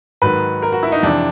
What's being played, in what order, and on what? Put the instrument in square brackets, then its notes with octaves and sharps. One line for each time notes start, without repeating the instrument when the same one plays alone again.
[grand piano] G#2 D#3 F#3 B4
A#4
F#4
E4
D#4
F2 C3 E3 D4